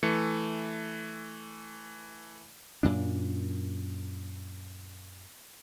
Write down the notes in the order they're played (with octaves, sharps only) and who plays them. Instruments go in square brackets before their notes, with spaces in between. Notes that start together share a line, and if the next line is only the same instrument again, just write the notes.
[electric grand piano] E3 A3 C#7
[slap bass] F#2 A#2 D4